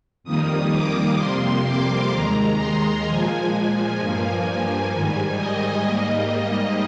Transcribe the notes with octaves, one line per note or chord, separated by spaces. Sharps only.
F2 D#3 G3 A#3 D#6
D6
F2 C3 G3 A#3 C6
D6
D#2 D#3 G#3 A#5
C6
A#2 F3 G#3 G#5
G#5
G2 F3 A#3
G#2 D#3 G3 G#5
D#5
G#2 G3 A#3